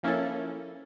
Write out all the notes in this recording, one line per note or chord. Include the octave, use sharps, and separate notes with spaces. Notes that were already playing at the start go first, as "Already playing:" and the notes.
F3 A#3 C#4 E4 A4